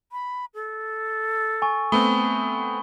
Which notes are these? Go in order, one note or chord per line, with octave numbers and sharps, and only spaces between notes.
B5
A4
G#5 C#6
A3 B3 C4 B5 D#6 G7